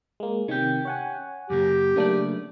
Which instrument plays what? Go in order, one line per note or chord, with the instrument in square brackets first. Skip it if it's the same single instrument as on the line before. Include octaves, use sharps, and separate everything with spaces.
[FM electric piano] G#3 A#3
[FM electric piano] C3 D#3 [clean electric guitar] C#4 G4
[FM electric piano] C#5 F#5 G#5
[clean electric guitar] F#2 C#3 A#3 [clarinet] G4
[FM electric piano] C#3 A#3 D4 [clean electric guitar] F#3 A3 D5